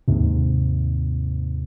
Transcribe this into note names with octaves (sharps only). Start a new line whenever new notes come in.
D#2 G#2 C3